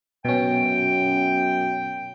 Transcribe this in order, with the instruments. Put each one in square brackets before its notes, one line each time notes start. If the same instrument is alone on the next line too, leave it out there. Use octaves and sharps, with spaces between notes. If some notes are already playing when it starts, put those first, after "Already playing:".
[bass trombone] F#2 [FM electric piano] B2 C#4 [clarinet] G5